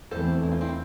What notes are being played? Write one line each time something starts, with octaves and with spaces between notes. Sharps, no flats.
E2 E3 A3 C4 A4 C5
E4
F4
C4 E4